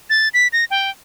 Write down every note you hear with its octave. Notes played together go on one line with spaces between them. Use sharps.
A6
B6
A#6
G5